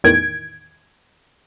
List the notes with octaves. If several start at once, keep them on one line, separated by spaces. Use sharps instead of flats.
E2 A2 D#3 E3 G#6 D7